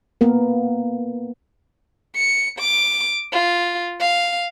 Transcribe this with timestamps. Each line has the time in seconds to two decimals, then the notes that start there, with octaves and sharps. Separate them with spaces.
0.21 A#3 B3 A#4
2.15 C#7
2.59 D6
3.33 F4
4.01 F5